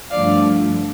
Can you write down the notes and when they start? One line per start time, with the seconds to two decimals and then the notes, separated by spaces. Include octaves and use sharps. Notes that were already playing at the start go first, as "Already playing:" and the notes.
0.11 G2 D3 F3 A3 D5 F5